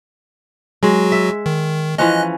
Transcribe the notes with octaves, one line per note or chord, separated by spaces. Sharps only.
F#3 G#3 F#4
E5
D#3
E3 F3 C#4 D#5 F#6